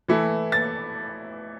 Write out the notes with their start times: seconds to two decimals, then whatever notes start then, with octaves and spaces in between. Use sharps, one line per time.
0.08 E3 A3 E4
0.52 A6